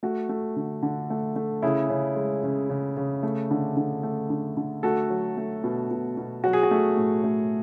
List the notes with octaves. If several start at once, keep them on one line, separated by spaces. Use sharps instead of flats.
A3 F#4
A3
D3
D3
A3
A3
C#3 E4 G#4
C#3
G#3
C#3
C#3
C#3
A3
D3
D3
A3
D3
D3
A3 F#4 A4
F#3
A3
B2
B2
B2
F#3 F#4
G#4
F#4
A3
A2
A3